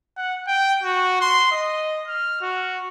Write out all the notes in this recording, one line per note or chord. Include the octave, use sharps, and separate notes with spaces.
F#5
G5
F#4
C6
D#5
F6
F#4